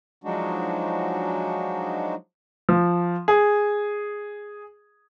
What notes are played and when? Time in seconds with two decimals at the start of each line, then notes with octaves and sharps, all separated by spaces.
0.24 F3 F#3 G#3 D4 D#4 F#4
2.69 F3
3.28 G#4